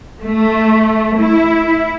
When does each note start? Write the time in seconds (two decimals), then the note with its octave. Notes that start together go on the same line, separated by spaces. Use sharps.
0.23 A3
1.20 E4